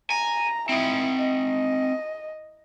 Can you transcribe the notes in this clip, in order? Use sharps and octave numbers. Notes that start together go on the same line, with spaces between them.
G#5 A#5
C4 D#4 E4
D#5